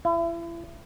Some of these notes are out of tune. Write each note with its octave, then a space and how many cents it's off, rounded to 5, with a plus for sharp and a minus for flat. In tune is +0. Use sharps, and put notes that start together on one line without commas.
E4 +35